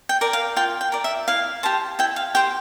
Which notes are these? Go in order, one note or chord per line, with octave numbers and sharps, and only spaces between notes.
G5
A#4 D5
F5
F4 G5
G5
A#4 D5
E5
E4 F5
G4 C5 A5
E4 G5
F5
G4 C5 G5